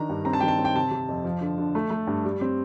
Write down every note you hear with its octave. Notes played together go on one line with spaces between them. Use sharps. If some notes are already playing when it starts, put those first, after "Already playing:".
Already playing: D#3 D4 A#5
G2
C4 A#5
A5
D#3 G5
A5
C4
G5
C3 A5
C3
F2
F3
D3
D3
A3
A3
G2
G3
C4